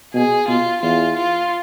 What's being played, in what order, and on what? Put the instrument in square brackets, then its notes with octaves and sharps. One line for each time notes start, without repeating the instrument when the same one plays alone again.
[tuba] B2 [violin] G#4
[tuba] B2 [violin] F4
[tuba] E2 [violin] F4
[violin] F4